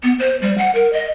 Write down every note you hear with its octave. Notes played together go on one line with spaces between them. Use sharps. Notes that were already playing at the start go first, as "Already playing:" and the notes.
B3
C5
G3
F#5
A#4
D#5